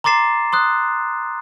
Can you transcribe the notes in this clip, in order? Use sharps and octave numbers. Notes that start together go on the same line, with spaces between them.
A#5 C6 D6 A6 C7 E7
C6 D#6 F#6